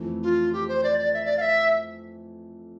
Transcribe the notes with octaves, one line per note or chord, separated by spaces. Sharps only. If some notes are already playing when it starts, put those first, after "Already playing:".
Already playing: F2 E3 A3
F4
G4
C5
D5
D5
E5
D5
F5
E5